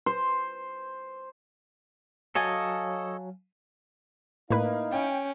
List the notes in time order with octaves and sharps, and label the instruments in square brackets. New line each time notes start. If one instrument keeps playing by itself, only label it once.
[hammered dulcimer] C5
[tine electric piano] F#3 [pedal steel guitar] A4 C#5 D#5 [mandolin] F5 G#5 A5
[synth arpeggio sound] A2 B4 [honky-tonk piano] A#3 [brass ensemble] D#4 E4 F5
[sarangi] C#4 [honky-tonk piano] G5